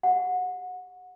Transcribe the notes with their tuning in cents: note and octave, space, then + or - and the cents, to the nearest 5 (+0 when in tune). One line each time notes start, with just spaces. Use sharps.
G4 +25 F#5 -20